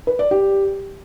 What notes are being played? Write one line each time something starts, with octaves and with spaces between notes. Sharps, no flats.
B4
D5
G4